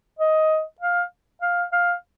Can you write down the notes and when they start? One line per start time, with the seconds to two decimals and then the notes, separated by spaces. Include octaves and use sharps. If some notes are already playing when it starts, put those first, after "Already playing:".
0.19 D#5
0.80 F5
1.42 F5
1.72 F5